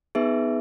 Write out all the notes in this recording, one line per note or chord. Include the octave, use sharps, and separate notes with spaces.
B3 D#4 G#4 B4 E5